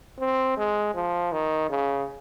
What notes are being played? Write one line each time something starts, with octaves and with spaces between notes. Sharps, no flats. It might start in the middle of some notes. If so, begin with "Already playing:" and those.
C4
G#3
F3
D#3
C#3